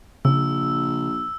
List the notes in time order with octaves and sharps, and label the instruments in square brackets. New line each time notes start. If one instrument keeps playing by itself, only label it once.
[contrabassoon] A#1 [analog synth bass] C#3 [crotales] E6